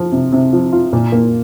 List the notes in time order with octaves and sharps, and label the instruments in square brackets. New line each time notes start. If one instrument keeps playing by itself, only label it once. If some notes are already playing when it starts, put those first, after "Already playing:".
Already playing: [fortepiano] F3
C3
C3
F3
F4
A#2
A#3